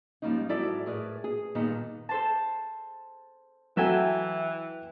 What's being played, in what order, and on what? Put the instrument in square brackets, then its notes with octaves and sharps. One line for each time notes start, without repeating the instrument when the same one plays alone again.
[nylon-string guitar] G#2 F3 G3 A#3 C#4 D#4
G#2 F3 F#3 E4 A4 D5
A2 G#4 A#4 B4 D5
G#4
G2 A#2 D#3 B3 D#4
[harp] A4 C5 A5
[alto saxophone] E3 [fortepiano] F#3 F#4 A4 [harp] E5 G5 G#5